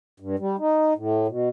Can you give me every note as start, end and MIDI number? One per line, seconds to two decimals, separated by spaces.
0.20 0.36 43
0.39 0.56 55
0.59 0.93 63
0.96 1.27 45
1.28 1.49 47